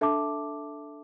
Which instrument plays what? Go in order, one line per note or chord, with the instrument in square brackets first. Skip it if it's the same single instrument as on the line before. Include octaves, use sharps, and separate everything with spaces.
[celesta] D4 A4 E5 A5 D6